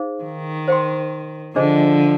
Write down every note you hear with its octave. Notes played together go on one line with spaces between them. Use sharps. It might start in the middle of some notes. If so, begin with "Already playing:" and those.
Already playing: D#4 G#4 C5 F5
D#3
C5 G5 C6
D3 F3 D4 G#4 C5 D#5 G#5